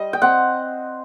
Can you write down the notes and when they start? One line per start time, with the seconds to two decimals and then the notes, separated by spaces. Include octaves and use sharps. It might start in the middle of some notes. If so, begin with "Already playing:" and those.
Already playing: G3 D#5
0.13 G5
0.22 C4 F#5